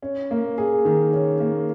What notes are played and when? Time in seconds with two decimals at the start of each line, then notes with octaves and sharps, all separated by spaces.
0.02 C#4
0.31 A#3
0.58 G#4
0.85 D#3
1.13 C#4
1.40 A#3